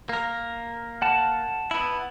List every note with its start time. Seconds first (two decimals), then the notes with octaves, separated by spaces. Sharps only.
0.09 A#3 A#4
1.02 F#5 A5
1.71 B3 E4